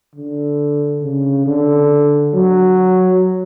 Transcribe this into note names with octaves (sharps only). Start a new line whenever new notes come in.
D3
C#3
D3
F#3